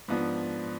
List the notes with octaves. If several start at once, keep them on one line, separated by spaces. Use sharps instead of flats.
G#2 F3 B3 D4